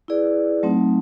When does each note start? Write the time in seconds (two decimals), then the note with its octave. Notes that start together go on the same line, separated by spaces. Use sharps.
0.08 E4 G#4 B4 D5
0.63 F#3 A3 C4 D#4